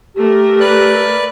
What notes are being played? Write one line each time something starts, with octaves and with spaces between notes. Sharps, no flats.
A3 G4 A#4
B4 D5 F#6